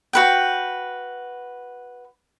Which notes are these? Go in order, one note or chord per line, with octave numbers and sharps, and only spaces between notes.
F#4 B4 G5